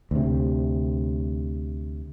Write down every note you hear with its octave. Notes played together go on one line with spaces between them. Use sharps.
D2 C3